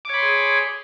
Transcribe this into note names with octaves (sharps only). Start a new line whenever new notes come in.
G#4 C#5 B5 C6 D6